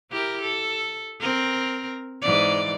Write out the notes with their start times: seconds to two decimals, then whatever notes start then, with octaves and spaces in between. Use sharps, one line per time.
0.11 E4 G4 A#4
0.41 A4
1.21 C4 A#4
2.21 G#2 E3 D5